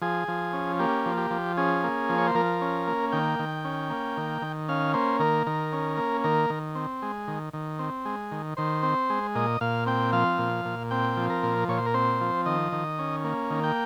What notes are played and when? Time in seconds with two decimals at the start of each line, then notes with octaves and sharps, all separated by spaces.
0.02 F3 G#4
0.28 F3
0.53 C#4
0.79 A#3 G4
1.06 F3
1.18 G4
1.31 F3
1.57 C#4 G#4
1.84 A#3
2.09 F3
2.18 C#5
2.27 C5
2.35 F3 A#4
2.61 C#4
2.87 A#3
3.12 D#3 G5
3.39 D#3
3.65 C#4
3.90 A#3
4.17 D#3
4.42 D#3
4.69 C#4 F5
4.94 A#3 C5
5.20 D#3 A#4
5.47 D#3 A#4
5.73 C#4
5.97 A#3
6.24 D#3 A#4
6.50 D#3
6.75 C4
7.02 G#3
7.28 D#3
7.53 D#3
7.79 C4
8.05 G#3
8.31 D#3
8.57 D#3 C5
8.83 C4
9.10 G#3
9.35 A#2 D#5
9.61 A#2 F5
9.86 C4 G5
10.12 F3 F5
10.38 A#2
10.65 A#2
10.91 C4 G5
11.17 F3
11.30 A#4
11.43 A#2
11.68 A#2 C#5
11.78 C5
11.86 A#4
11.94 C4 C5
12.21 F3
12.46 D#3 D#5
12.72 D#3
12.99 C#4
13.24 A#3
13.50 D#3
13.64 G5